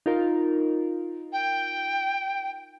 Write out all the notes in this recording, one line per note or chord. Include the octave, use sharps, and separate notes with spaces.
D#4 F4 A#4
G5